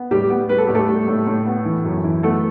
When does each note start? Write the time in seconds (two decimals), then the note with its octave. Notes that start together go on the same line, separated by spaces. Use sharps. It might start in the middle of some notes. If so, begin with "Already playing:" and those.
Already playing: B3
0.11 A2 G3 G4
0.30 B3
0.49 G3 B4
0.58 A4
0.67 A2 G4
0.75 A3 A4
0.89 G3
1.08 A2
1.27 A2
1.46 B3
1.65 E3
1.85 F#2
2.04 E3
2.23 A3 B3 A4